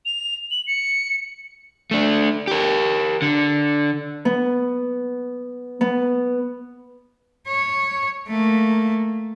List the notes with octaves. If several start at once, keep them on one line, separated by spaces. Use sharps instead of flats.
F7
F#7
C#7
A3 D4
G4 A#4
D3
B3
B3
C#5
A3 A#3